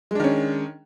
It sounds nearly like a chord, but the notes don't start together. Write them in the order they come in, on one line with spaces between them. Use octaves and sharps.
G#3 D4 D#3 C#4